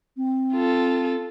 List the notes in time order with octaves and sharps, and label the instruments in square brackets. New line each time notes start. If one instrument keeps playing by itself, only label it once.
[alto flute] C4
[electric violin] F4 A4